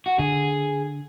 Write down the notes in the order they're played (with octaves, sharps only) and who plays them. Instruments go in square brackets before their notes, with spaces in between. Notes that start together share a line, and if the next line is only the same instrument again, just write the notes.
[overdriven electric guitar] F#4
[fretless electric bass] D3 [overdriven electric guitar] G#4